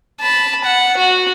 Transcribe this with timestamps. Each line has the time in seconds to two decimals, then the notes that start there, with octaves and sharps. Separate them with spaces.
0.21 A5 B5
0.65 F#5
0.97 F#4